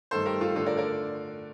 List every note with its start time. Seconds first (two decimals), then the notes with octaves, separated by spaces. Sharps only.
0.11 G2 D#3 A3 A4 C5
0.26 G4 A#4
0.41 F4 A4
0.56 D3 A3 D4 F4 A4
0.66 A#4 D5
0.77 A#4 D5